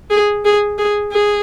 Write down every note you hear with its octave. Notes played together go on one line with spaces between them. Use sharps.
G#4
G#4
G#4
G#4